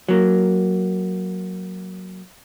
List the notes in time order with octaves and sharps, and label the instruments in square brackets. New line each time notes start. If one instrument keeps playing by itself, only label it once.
[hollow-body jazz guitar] F#3 A#3